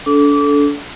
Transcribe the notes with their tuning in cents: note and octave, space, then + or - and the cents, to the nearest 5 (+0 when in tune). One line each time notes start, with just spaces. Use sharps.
D4 -35 A4 -15 D6 -25